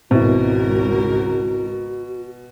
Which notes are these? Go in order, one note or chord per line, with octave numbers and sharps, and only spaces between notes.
G#1 C#2 B2 C4 E4 F#4 A#4